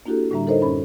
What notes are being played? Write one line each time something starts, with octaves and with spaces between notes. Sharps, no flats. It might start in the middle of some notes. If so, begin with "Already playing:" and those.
A#3 D4 E4 F#4 G4 A4
A2 D3 G3 D4 E5 A#5
D#4 A4 A#4 C5 C#5 D#5
F#2 C#4 B5